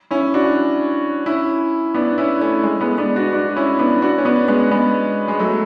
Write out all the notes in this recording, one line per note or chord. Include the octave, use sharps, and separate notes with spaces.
C#4 E4
D4 F#4
C#4 E4
B3 D4
C#4 E4
A3 C#4
G#3
G#3 B3
B3 D4
D4 F#4
D4 F#4
C#4 E4
B3 D4
D4 F#4
C#4
B3 D4
G#3 B3
G#3 B3
G#3
F#3 A3